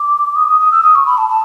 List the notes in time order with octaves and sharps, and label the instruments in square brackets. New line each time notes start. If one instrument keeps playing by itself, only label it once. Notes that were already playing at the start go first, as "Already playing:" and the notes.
Already playing: [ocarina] D6
D#6
D6
D#6
D#6
E6
D#6
C#6
B5
A5
A5